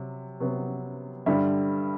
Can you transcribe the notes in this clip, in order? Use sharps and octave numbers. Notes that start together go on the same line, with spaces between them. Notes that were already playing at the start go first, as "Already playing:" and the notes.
Already playing: C3 F#3
C3 F#3 B3
G2 D3 G3 E5